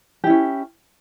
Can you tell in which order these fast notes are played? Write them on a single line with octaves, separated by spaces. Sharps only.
G4 E4 C#4